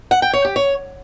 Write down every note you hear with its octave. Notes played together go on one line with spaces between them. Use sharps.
F#5
G5
C#5
G4
C#5